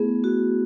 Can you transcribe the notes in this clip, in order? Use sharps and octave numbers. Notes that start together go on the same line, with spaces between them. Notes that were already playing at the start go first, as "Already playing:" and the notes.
Already playing: A3 B3 E4 G#4
F#4